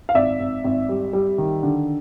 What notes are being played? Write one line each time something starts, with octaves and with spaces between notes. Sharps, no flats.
F5
G#1 D5 E5
G#1
G#1
G3
G3
D#3
D3